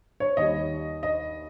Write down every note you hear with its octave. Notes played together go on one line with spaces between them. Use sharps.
C#5
D#2 D#3 G3 D#5
D#5